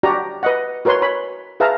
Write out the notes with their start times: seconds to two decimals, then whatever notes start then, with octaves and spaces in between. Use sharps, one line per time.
0.03 D4 F#4 G4 D5 A#5
0.43 B4 D#5 F#5
0.85 F#4 A#4 B4 C#5 C6
1.02 C#5 B5
1.60 G#4 B4 E5 F5 A5 A#5